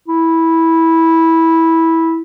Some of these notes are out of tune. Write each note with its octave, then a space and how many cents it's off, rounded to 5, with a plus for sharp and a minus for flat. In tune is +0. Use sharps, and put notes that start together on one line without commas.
E4 -10